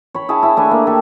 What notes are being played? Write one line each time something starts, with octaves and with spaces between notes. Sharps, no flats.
C#5 B5
E4 G#4 C#5 A5
E4 E5
A3 D4 G#5
A#3
G4 A4